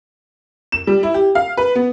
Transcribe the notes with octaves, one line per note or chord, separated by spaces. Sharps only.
E7
G3
E4
G4
F5
B4
B3